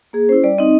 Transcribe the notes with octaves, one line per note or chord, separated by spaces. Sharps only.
A#3 G#4
C#4 E4 C5
G3 D5
C4 D#4 D#5